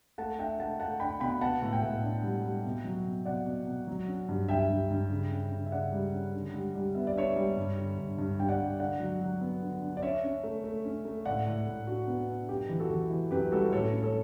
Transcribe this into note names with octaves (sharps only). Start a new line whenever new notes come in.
A3 F#5 A5
D4 E5 G5
A3 F#5 A5
A3 F#5 A5
D4 G5 B5
B2 G5 B5
B3 F#5 A5
A2
E5 G5
A2
D4
G3
G3
B2
F#3
B2
B2 D5 F#5
B2
B2
F#3
C#4
G2
G2 E5 G5
G2
G2
C#3
C#4
C#3
E5
C#3 D5 F#5
G3
C#4
D3
G3
G3
B3 E5
D5
D4 C#5 E5
G3
G2
D3
G2
G2
G2 G5
D5 F#5
G2
D3 D5 F#5
F#3
F#3
B3
D3
D4
D5
C#4 C#5 E5
C#4
A3
A3
C#4
A3
A2 D5 F#5
A2
A2
D4 F#4
B3
D4
F#2 G4
E3
F#4 A4
E3
E3
F#2 G4 B4
G3 F#4 A4
A2 A4 C#5
C#4
A4 C#5